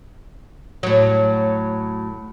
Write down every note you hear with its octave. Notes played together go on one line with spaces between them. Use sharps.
A2 F#3